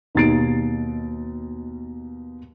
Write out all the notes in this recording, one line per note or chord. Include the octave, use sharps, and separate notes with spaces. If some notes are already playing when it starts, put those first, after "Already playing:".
D#2 B2 D#4 A6 C7 D7